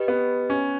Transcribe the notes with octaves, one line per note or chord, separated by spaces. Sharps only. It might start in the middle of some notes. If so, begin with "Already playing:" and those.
Already playing: G4 B4 D#5
B3
C#4